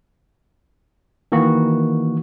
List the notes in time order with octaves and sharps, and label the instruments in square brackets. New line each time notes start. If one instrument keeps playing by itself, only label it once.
[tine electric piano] D#3 E3 A#3 F#4